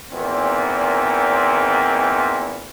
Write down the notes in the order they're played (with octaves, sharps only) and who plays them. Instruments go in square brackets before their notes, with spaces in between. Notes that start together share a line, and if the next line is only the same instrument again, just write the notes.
[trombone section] G#1 E2 A#2 C4